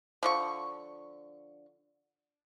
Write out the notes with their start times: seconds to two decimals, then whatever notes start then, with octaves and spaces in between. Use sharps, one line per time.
0.23 D3 F3 C#6